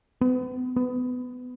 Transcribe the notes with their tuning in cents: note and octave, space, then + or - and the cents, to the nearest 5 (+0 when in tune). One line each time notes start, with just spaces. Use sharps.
B3 +35
B3 +20